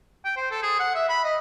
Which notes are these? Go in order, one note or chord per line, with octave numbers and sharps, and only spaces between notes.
G5
C5
A4
G#4
F#5
E5
B5
D#5